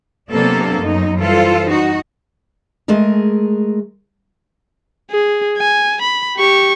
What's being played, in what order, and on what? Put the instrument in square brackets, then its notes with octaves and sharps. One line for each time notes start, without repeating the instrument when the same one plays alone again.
[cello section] C3 F#3 A#3 B3 D4 A4
F#2 F#3 D#4
E3 G3 F4 A4 C5
D#4 F#4
[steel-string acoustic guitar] G#3 A3 G#4 A#4
[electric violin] G#4
G#5
B5
G4 C#6